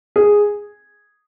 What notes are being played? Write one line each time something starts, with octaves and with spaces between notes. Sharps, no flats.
G#4